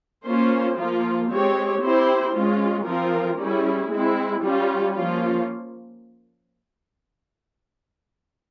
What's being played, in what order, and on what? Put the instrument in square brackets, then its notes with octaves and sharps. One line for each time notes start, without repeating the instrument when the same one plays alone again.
[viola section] A#3 C#4 F4 C5
F3 A#3 F4
G#3 C4 G4 C#5
C4 E4 G4 C5
G#3 C#4 F4
F3 C4 F4 A#4
G3 C#4 E4 G#4
G#3 C4 E4
G3 C#4 F4
F3 A#3 C#4 F4